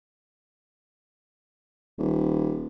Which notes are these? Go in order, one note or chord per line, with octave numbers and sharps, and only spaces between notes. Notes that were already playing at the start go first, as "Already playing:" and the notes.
D#1